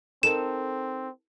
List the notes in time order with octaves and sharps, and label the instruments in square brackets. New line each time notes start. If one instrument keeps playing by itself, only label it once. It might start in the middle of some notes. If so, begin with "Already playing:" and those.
[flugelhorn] C4 [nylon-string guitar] D#4 A4 A#4 [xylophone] E7